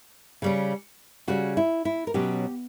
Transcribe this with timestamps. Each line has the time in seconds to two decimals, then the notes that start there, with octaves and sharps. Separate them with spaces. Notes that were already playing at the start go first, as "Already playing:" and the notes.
0.42 C#3 G3 C#4
1.28 C#3 G3 C#4 F#4
1.57 E4
1.85 E4
2.07 A#4
2.14 B2 F#3 C#4 G4